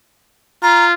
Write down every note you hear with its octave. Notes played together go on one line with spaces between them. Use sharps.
F4 A#5